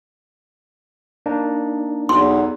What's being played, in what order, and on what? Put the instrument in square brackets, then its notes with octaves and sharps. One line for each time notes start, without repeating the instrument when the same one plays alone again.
[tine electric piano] A#3 D4 D#4
[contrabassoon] B1 [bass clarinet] E2 [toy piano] C6